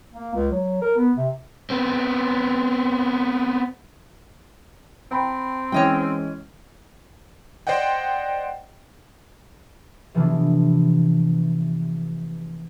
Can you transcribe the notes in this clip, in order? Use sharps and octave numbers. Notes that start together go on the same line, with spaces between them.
A#3
C#2
F#3
A#4
B3
C3
B3 C4
C4 G5 A#5 B5
E3 G#3 C#4 C#5 D#5 G5
C5 D5 D#5 F#5 G5
C3 E3 F3 A3 B3 D4